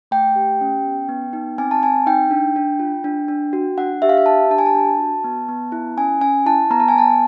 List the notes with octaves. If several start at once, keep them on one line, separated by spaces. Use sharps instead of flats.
A3 G5
G4
C#4
B3
B3
D#4
C4 G#5
A5
C4 G#5
D#4 G5
D4
D4
F4
D4
D4
F#4
D4 F#5
G4 E5
F5
E5
G4 A5
D4 A5
G#5
A5
D4
F#4
B3
B3
E4
C#4 G#5
C#4 G#5
E4 A5
B3 A#5
A5
G#5
B3 A5